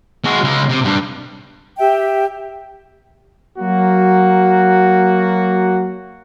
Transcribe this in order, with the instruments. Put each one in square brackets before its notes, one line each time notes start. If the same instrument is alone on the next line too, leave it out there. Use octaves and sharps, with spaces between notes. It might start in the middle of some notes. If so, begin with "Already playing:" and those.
[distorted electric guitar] G#3 F#4
C#3 G#3
C3
G2
[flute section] G4 E5 G5
[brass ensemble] F#3 A#3 F#4